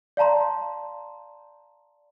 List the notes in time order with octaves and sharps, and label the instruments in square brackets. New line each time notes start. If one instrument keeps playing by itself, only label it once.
[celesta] D5 F5 A5 A#5 C6